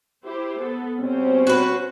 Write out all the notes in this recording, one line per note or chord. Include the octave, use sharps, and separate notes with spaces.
E4 G4 C5
B3 A4
B2 G3 C4 C#4 C5
F#4 B4